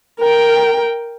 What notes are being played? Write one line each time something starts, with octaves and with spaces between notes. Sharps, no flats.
A#4 G5